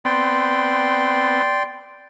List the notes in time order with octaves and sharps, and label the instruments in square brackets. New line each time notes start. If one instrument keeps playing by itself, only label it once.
[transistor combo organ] B3 C4 [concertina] D5 G5 C6